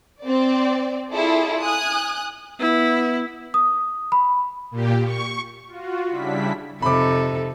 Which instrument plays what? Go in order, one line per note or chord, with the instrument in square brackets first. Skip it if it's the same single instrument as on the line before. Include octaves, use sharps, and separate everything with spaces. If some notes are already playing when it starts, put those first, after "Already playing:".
[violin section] C4 D5
E4 F4 G#4 A4 D5
G#5 D#6 F#6
[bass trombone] B3 [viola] E4
[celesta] D#6
B5
[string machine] A#2 G4
C#6
[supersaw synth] F4 F#4
C#3 G3 D4 E4 B6
[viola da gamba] F2 D#4 A4 [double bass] C3 [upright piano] B5 D6